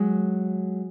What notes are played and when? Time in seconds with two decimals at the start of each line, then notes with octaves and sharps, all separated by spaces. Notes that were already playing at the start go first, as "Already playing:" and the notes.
Already playing: F#3 G#3